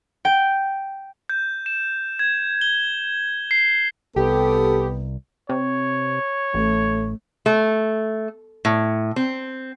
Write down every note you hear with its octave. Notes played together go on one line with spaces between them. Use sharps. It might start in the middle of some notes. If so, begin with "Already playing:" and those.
G5
G6
E7
G#6
G7
C7
C2 B3 G4 A4
C3 C#5
A1 A3
A3
A2
C4